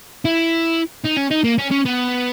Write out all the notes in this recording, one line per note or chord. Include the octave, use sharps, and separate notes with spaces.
E4
D#4
C#4
D#4
A#3
C#4
C#4
B3